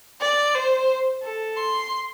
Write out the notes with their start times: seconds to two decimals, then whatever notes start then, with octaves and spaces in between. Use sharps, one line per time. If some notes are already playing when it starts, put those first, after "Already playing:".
0.21 D5
0.55 C5
1.23 A4
1.57 C6